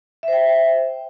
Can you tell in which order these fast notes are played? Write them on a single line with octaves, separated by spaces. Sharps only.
E5 C5 G5